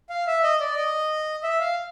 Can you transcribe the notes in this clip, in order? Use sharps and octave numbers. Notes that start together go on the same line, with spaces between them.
F5
E5
D#5
D5
D#5
E5
F5